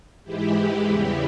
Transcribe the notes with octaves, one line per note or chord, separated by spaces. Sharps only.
G#2 E3 G#3 E4 G4
E2 C#3 E3 G3